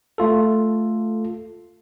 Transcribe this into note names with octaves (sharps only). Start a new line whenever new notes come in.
A3 F4 A4